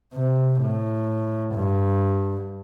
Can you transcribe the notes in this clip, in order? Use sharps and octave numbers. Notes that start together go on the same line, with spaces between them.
C3
A2
G2